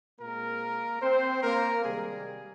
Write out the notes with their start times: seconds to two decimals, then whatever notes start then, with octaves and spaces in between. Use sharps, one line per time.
0.20 A#2 G#3 A#3 C4 A#4
1.02 C4 C5
1.43 A#3 A#4
1.84 C3 D#3 G3 G#3 G#4